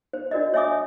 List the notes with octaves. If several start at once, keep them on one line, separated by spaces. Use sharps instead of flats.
C5
D4 F#4 A#4 D5 D#5
C#5 D#5 E5 G#5 D6 D#6